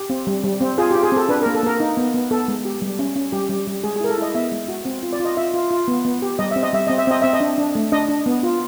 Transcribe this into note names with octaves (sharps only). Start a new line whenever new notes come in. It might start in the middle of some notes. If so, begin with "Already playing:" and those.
Already playing: G4
C4
G3
G3
C4
F4 G#4
G4
F4
G#4
C4 A4
D4 B4
A#3 A#4
A4
A#3 A#4
D#4
B3
B3
B3 A4
G#3
G4
G3
C#4
C#4
G3 G4
G3
G3
G#3 G#4
G#4
E4 A#4
A4
E4 D#5
B3 E5
G#3
F#4
C4
F4
D5
F4 D#5
F4 E5
F4
F4
B3
B3
G4
G3 D#5
C4 E5
D#5
G3 E5
C4 D#5
E5
C4 D#5
C4 E5
D#5
D4
D4
A3
D4 D#5
D4
B3
F4